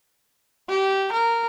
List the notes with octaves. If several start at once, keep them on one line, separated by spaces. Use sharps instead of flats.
G4
A#4